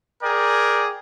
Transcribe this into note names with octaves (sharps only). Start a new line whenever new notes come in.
G#4 A#4 D5 G5